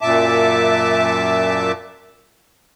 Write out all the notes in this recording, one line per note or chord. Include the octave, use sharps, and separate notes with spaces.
F#2 A#2 E5 A5 D6